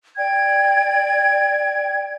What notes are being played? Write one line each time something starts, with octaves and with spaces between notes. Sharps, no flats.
D5 G5 G#6